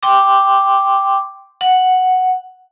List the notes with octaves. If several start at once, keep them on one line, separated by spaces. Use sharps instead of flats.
G5 C6 D6
F#5